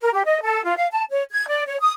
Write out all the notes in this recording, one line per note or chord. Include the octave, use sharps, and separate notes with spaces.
A#4
G4
D#5
A4
F4
F5
A5
C#5
G#6
D5
C#5
D#6